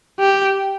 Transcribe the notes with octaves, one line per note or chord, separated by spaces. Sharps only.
G4